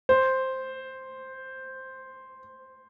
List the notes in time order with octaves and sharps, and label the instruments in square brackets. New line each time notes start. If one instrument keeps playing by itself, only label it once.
[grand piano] C5